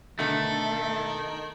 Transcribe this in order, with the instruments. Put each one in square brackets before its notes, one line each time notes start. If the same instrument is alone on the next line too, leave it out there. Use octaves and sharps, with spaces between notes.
[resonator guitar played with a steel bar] B2 D3 [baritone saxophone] D#3 [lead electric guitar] A3 [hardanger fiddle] A4